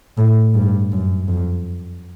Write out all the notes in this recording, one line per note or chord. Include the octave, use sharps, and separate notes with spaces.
A2
G2
F#2
F2